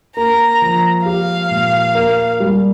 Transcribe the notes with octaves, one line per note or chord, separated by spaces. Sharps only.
A#3 A#5
F3
G4 F5
A#2
A#3
G3